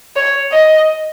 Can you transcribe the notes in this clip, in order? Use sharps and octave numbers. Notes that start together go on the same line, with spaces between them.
C#5
D#5